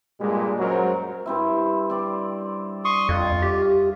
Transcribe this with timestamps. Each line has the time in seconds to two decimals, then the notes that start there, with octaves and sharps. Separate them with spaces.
0.20 G2 A#2 G3 G#3
0.59 F#2 F#3 G#3 F#4 A#4 C5
1.26 G2 C4 E4
1.90 C4 D5
2.85 C6 C#6 D#6
3.09 F2 F4
3.42 G4